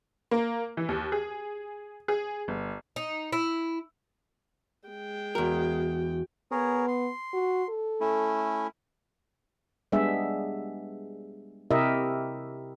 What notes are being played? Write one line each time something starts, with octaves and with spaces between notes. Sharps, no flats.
A#3
E3
D#2
G#4
G#4
G1
D#4
E4
G#3 G5
E2 F#4 A#4
B3 G#4 A#4 C#5
C6
F#4
A4
A3 C#4 E4
G3 G#3 B3 D4 G#4 E5
C3 E4 G4 A#4 D#5 E5